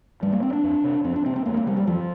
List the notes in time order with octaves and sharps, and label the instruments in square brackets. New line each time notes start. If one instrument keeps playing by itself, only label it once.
[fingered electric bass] G#2 G3
A#3
C4
D4
F2
C3
F2 C4
D4
C3 C4
C4
F2 A#3
A#3
C3 G3
G3
F2 F3